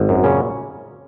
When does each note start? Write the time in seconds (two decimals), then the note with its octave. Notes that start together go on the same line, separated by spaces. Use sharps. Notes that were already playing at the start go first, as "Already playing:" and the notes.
Already playing: G#1
0.09 F#2
0.24 A#2 C#3 C#4